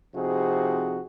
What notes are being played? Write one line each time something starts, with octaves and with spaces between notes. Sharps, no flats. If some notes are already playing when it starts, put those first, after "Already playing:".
C3 F3 C4 D#4 F#4 G#4